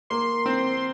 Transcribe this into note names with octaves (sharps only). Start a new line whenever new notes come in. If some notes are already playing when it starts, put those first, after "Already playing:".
A#3 C6
C4